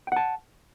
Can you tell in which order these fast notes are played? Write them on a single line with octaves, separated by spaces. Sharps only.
G5 F#5 A5